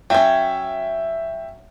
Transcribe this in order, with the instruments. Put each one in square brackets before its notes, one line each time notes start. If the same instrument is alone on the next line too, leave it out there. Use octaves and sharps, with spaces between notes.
[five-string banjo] F#3 C#4 [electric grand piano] E5 G5